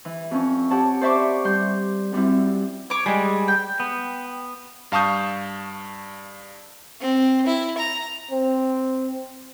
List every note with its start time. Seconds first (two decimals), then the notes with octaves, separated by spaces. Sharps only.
0.05 E3
0.31 F2 C#4
0.70 G4 C#5 F#5 A5
1.01 C5 D5 E5 B5 C#6 D6
1.44 G3 C6 G6
2.12 F#2 G3 C4 E4
2.90 C#5 D6
3.06 G3 G#3 G#4
3.48 G5
3.80 B3
4.92 G2 F5 A5 C#6 D#6 G6
7.01 C4
7.46 E4
7.78 A#5
8.31 C4